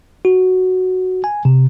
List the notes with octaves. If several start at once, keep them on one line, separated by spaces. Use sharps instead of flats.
F#4
G#5
C3